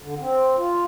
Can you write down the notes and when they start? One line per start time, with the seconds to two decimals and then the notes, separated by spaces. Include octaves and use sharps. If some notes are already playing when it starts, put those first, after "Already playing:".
0.02 D3
0.19 C4
0.57 F4